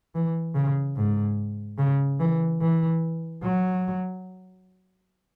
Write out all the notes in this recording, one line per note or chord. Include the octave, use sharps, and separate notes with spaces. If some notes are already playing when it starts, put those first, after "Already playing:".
E3
C#3
G#2
C#3
E3
E3
F#3